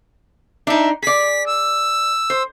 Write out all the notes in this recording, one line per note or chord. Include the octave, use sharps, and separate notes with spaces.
D4 D#4 E5
G#4 D5 B6
E6
C5